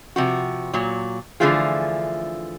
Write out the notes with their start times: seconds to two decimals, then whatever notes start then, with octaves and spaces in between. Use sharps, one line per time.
0.16 C3 F3 F#4
0.74 A#2 F#3
1.40 D3 E3 F3 A3 F4 G#4